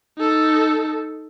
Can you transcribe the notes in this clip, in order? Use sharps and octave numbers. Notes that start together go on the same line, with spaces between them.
D#4 A4